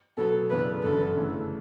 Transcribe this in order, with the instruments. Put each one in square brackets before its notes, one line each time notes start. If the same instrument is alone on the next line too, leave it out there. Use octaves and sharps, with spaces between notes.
[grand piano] B2 F#3 B3 [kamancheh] A4
[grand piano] F#2 C#3 E3 B3 D4 [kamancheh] B4
[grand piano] G1 F#2 D3 [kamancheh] A4
[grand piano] C#3 E3 A3